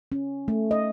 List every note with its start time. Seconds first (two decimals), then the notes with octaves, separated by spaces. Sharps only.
0.12 C#4
0.48 A3
0.71 D#5